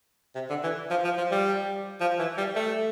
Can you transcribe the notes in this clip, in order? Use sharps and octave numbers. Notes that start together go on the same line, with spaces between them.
C3
D3
E3
F3
F3
F3
G3
F3
E3
G3
A3